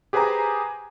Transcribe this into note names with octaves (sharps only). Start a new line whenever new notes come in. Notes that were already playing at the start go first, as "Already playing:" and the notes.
G4 G#4 B4 C5 G#5 A#5